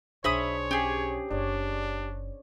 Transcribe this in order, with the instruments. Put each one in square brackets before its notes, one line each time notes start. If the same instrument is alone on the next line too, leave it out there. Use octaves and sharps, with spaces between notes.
[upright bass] B1 [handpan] D4 G#4 C5 [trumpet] C#5 [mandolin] E5 B5 D#6
[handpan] C#4 [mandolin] G4 G#4
[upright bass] F#1 [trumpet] D4 [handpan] C#5 D5